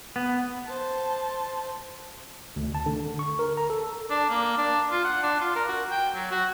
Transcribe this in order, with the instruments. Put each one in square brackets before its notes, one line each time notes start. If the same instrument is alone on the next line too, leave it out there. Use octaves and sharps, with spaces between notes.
[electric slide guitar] B3
[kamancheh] C5 A5
[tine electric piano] D2
A5
D3
C#6
A#4
A#5
A4
[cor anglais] D4
A#3
D4
F4
F#5
D4
F4
A#4
F#4
G5
F#3
F#4